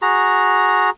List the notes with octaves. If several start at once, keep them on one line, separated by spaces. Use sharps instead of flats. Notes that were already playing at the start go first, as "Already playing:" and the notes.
F#4 G#4 A#5